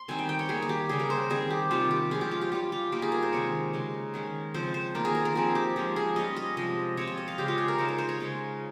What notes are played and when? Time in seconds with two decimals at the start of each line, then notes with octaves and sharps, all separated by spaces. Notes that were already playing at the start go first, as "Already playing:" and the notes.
Already playing: C6
0.08 D#3 G3 C4 D#4 G#5
0.19 G5
0.29 G5
0.39 C#5
0.49 D#3 G3 A#3 G#4
0.62 G#4
0.69 G4
0.89 C#3 G3 A#3 G#4
0.99 A#4
1.10 C5
1.30 D#3 G3 C4 G#4
1.50 G4
1.71 C3 D#3 G3 C4 F4
1.91 G4
2.11 F3 G#3 C#4 F4 G#4
2.21 G4
2.31 F4
2.41 G4
2.52 G3 C#4 F4 G4
2.72 F4
2.92 G3 A#3 D#4 G4
3.02 G#4
3.12 A#4
3.22 C5
3.32 C3 D#3 G#3 C#5
3.73 C#3 G#3 D#4
4.14 D#3 G#3 C#4
4.54 C#3 F3 C4 C5
4.74 C5
4.95 D#3 A#3 F4 A#4
5.05 G#4
5.15 A#4
5.25 A#4
5.35 F3 C4 D#4 G#4
5.55 G4
5.76 F3 G#3 C#4
5.96 G#4
6.16 G3 C#4 F4 D#5
6.36 D#5
6.57 C3 F3 G#3 D#5
6.97 F3 C4 F4 C#5
7.07 D#5
7.18 D#5
7.28 F5
7.38 C#3 G#3 C#4 G4
7.48 F4
7.58 G#4
7.68 A#4
7.78 C#3 G#3 D#4 C5
7.88 A#4
7.98 C5
8.09 C#5
8.19 C#3 G#3 C#4 F4